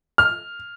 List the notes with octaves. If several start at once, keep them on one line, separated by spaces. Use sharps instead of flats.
F6